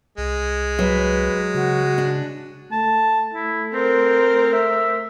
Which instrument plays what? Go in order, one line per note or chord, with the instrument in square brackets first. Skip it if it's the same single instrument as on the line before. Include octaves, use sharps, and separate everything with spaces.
[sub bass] C2 [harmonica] G#3
[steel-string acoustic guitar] F#3 [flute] B4
[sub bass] C#3 [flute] F#4
[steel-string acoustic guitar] D4
[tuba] A3 [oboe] A5
[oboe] E4
[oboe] C4 [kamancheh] A#4 C5
[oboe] E5